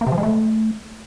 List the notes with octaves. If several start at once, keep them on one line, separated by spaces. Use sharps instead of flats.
A#3
C3
F3
G#3
A3